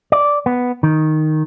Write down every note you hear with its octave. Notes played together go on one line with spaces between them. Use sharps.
D5
B3
D#3